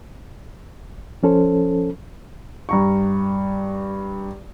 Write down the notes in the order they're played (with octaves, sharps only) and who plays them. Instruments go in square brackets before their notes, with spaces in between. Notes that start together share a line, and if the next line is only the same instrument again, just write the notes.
[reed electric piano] F3 C#4 A4 C5
[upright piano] G2 A#5 C#6